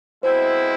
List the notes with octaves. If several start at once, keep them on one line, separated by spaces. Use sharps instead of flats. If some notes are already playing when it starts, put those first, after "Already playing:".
B2 G#3 C4 E4 C5